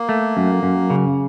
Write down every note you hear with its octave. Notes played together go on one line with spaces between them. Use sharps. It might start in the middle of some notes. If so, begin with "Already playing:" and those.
Already playing: A#3
A3
F#2
F#2
C#3